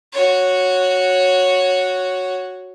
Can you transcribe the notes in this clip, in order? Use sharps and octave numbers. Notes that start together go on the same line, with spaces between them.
F#4 C#5